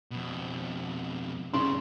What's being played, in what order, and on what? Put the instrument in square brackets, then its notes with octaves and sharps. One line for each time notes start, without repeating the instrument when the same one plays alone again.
[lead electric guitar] F2 B2
[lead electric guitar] G#2 D4 [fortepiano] C#3 C6